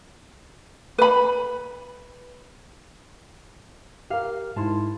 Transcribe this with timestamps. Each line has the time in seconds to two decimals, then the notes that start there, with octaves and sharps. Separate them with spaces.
0.98 B4 B5
4.10 G4 A#4 F5
4.56 G#2 E4 A5 C6 G#6